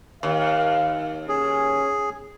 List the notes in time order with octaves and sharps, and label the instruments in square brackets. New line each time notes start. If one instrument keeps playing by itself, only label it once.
[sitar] D#2 [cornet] F5
[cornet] C#4 [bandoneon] G#4